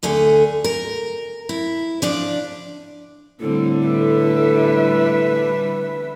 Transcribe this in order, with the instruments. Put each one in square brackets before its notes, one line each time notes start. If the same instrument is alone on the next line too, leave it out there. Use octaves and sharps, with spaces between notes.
[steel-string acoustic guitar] D2 D3 A3 G#4
A#4
E4
F3 D4 D5
[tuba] A2 [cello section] D3 G3 [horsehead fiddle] C4 [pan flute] A4
[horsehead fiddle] B4 E5